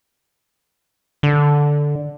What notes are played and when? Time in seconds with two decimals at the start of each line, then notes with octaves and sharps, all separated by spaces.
1.23 D3